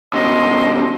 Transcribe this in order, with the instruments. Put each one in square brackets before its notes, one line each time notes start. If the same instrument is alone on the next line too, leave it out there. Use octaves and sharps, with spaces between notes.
[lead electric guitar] D#2 B2 [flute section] D#5 C6